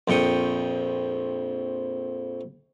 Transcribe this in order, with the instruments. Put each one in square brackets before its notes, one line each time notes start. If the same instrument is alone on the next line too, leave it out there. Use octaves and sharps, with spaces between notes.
[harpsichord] A#1 F2 G5 C#6 D#6